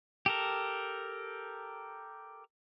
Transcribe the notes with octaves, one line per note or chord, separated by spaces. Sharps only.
G4 A4 A#4